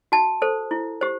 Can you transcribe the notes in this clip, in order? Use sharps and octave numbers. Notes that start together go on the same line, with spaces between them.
F#4 A5
A4 C5
E4
G4 C5